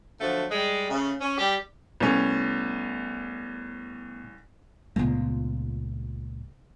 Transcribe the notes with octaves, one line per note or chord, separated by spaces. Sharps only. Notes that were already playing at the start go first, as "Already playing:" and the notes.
D3 F3 F#3 A3
G3 G#3
C#3 A3
C#4
G3 G4
C2 A3 B3 C#4
C#2 A#2 A3 B3